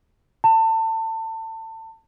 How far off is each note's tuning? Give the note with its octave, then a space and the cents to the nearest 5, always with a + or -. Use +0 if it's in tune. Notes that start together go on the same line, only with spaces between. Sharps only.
A5 +30